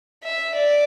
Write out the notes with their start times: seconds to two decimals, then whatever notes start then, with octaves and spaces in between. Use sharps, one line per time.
0.23 E5
0.55 D5